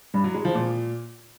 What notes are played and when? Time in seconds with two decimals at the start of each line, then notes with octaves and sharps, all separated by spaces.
0.14 G2
0.24 F#3
0.34 G#3
0.45 F3
0.55 A#2